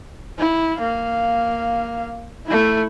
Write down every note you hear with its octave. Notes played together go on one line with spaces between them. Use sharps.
E4
A#3 F5
A3 E4